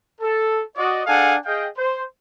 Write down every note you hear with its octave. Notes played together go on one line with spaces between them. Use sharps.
A4
F#4 D5 D#5
D4 G#4 A4 F5 F#5 G#5
G#4 D#5 F5 G5
C5